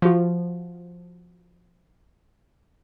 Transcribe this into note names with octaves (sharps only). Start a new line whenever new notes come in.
F3 F#4